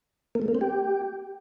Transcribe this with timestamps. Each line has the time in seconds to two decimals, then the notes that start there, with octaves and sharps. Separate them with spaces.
0.35 A#3
0.42 A3
0.48 A#3
0.55 C4
0.61 G4